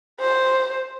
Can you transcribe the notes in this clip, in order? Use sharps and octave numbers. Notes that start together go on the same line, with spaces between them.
C5